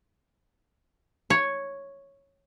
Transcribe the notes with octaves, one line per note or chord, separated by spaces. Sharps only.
C#5